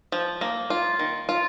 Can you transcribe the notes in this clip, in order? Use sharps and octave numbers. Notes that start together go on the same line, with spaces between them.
F3
A#3
F4
D#3
F4